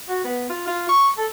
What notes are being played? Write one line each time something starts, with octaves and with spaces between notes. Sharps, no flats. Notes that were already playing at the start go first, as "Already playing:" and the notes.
F#4
B3
F4
F4
C#6
A4